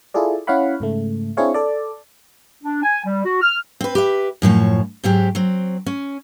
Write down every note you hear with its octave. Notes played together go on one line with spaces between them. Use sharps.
E4 F4 G#4 A4 D5
C#4 E4 C#5 F5 F#5 B5
G#2 C#3 A3
C4 D4 E4 G#4 C#5 F5
A4 D5
D4
G#5
G3
F#4
F6
C4 B4
G4 B4 E5
F#2 A2 F3 C#5
G#2 F#3 C4 G4
F#3 C4
C#4